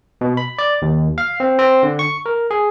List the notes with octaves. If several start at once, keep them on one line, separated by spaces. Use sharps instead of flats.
B2
B5
D5
D#2
F5
C4
C4
D3
C#6
A#4
G#4